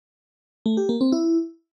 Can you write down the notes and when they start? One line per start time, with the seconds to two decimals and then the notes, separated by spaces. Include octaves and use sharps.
0.66 A3
0.77 G4
0.89 A#3
1.01 C4
1.12 E4